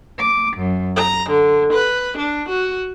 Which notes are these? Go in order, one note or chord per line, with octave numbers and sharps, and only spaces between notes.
D6
F#2
A#5
D3
B4
D4
F#4